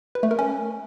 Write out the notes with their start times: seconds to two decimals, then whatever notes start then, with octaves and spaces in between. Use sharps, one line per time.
0.15 B4
0.23 A3
0.31 A#4
0.39 C#4